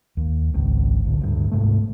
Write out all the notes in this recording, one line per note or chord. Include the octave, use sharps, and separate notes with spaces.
D#2
G#1 C#2
C2 A2 D3
D2 G2
G#2 C3 A3